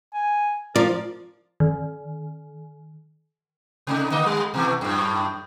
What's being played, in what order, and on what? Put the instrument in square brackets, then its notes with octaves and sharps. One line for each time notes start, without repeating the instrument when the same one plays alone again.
[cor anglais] G#5
[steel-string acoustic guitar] F3 [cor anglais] A#4 [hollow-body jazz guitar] D5
[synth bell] D#3
[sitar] C3 A3 D#4
D3 A#3 D#5
G3
B2 E3 A3
F#2 A2